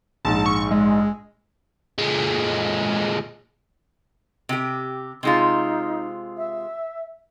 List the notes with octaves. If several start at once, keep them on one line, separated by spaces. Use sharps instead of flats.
A#1 G#2 A5
C#6
G#3
A#2 G#3
C3 G4
C3 G#3 D#4 F4
E5